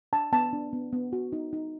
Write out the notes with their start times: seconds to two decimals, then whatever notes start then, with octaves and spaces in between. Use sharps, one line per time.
0.13 D4 A5
0.32 B3 A5
0.53 D4
0.73 B3
0.93 B3
1.13 F#4
1.33 D#4
1.53 D#4